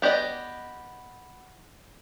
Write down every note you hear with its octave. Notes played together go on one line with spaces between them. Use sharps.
B3 G4 D5 D#5